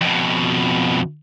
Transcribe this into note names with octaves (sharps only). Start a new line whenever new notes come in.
F2 B2